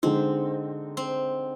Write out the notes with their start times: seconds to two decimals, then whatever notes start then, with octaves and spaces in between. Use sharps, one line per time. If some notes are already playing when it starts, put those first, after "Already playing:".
0.03 D3 G#3 C4 D#4
0.97 C4